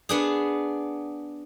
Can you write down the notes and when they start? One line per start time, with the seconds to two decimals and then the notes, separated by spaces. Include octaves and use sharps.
0.09 B3 D4 G#4